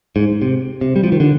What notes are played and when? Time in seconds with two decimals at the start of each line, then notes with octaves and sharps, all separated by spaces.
0.16 G#2
0.42 C3
0.81 C3
0.96 G3
1.04 F3
1.12 D#3
1.20 D3